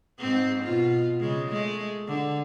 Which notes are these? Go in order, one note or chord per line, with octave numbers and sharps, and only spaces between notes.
G#2 C4
B2 F4
C#3 G#3
G#3 A3
D3